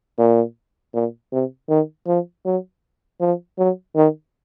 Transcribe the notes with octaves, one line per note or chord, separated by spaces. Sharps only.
A#2
A#2
C3
D#3
F3
F#3
F3
F#3
D#3